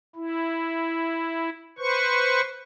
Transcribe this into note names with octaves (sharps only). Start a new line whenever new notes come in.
E4
B4 C5 C#6